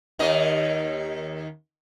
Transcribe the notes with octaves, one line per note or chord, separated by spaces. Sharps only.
D#2 D#3 D#5